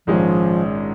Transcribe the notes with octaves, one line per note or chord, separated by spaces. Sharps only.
A#1 G#2 D#3 F3 G#3 C#4